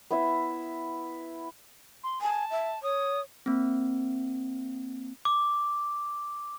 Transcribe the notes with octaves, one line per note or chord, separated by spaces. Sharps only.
B3 E4 E5
C6
G#5 A5
E5
C#5 D#6
A#3 C4
D6